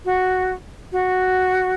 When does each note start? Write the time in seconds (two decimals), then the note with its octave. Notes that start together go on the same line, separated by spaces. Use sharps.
0.04 F#4
0.91 F#4